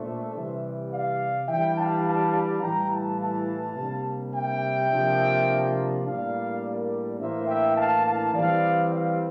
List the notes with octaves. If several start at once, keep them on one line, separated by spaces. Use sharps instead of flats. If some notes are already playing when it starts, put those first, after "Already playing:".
Already playing: A#2 A3 D4 C5 E5
C3 E3 G3
D5 F5
E3 G3 D4 E5 G5
F5 A5
F5 A5
F5 A5
A2 E3 G3 G5 A#5
F5 A5
F5 A5
C3 G3 A#3 D4
E5 G5
C3 F3 A#3 D4
A2 G3 A#3 D4 D5 F5
A#4 D5
A2 E3 A#3 D4 C5 E5
E5 G5
F5 A5
F5 A5
E3 G3 C4 D5 F5
D5 F5